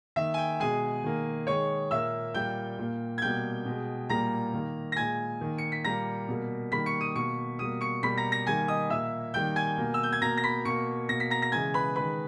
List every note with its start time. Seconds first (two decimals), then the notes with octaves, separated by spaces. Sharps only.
0.16 D#3 A#3 E5
0.34 G#5
0.38 G5
0.60 B2 G#3 G#4 G#5
1.04 D#3 A#3
1.47 D#3 G#3 C#5 C#6
1.90 A#2 A#3 E5 E6
2.34 A#2 G3 A#3 G5 G6
2.79 A#2 A#3
3.18 G#6
3.22 B2 G3 A#3 G5 G6
3.66 B2 G#3
4.09 A#2 G3 A#3 A#5 A#6
4.54 D#3 A#3
4.92 A#6
4.96 A#2 G#3 G#5 G#6
5.41 D#3 A#3
5.58 C#7
5.72 B6
5.85 A#2 G3 A#3 A#5 A#6
6.28 B2 G3 A#3
6.72 D#3 G3 A#3 B5 B6
6.86 C#6 C#7
7.01 D#6 D#7
7.15 B2 A#3 C#6 C#7
7.59 B2 G3 A#3 D#6 D#7
7.81 C#6 C#7
8.03 B2 G3 A#3 B5 B6
8.17 A#5 A#6
8.32 A#5 A#6
8.47 D#3 G3 A#3 G#5 G#6
8.68 D#5 D#6
8.90 A#2 A#3 E5 E6
9.34 D#3 G3 A#3 G5 G6
9.56 G#5 G#6
9.78 B2 A#3
9.94 E6
10.03 G6
10.13 G#6
10.22 B2 A#3 A#5 A#6
10.37 A#6
10.44 B5 B6
10.65 B2 A#3 C#6 C#7
11.09 B2 A#3 A#6
11.20 B6
11.30 A#5 A#6
11.42 A#6
11.52 C#3 E3 G#3 G#5 G#6
11.74 B4 B5
11.96 D#3 G#3 B4 B5